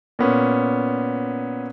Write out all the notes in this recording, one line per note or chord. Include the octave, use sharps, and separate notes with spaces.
A#2 B3 C#4